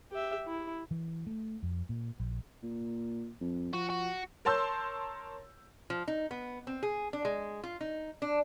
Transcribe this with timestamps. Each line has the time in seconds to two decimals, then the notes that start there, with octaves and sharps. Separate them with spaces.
0.11 G4 E5
0.47 E4
0.91 E3
1.27 A3
1.63 F2
1.89 A#2
2.20 A#1
2.63 A#2
3.40 F2
3.73 F3 F#4
3.90 F#4
4.45 A#4 C#5 A5 C6 E6 G6
5.90 F3
6.08 D#4
6.31 B3
6.67 C4
6.83 G#4
7.13 D4
7.25 G#3
7.64 F4
7.81 D#4
8.22 D4